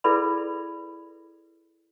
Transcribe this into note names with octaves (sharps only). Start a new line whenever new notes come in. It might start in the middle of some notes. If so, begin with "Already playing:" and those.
E4 G#4 A4 B4 D5 B5